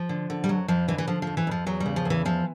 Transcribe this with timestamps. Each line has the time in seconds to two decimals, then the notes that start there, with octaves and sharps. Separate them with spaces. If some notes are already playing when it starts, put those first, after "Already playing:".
Already playing: F3
0.09 D3
0.30 D3
0.44 G3
0.49 F2 F#3
0.68 F2 F3
0.88 D3 E3
0.98 E3
1.07 D3 F3
1.22 F2 F3
1.37 E3
1.47 F2 F3
1.66 E2 F#3
1.80 G3
1.86 C#3
1.96 F3
2.05 E2 E3
2.25 E3 F3